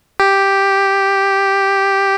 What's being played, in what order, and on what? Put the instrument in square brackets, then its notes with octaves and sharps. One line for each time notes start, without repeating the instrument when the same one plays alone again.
[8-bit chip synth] G4